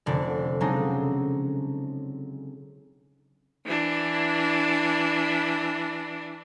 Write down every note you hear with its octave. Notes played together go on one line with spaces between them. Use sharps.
F1 D3 D5
C#3 F#3 G#3 C4 D4 D#4
E3 D4